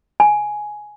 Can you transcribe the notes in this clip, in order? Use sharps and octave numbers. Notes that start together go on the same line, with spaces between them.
G#5